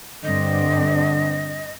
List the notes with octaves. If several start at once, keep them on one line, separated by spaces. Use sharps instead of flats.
G2 D3 C4 D4 D#5